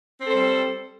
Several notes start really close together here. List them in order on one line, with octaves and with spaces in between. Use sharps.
C4 A4 C5 G3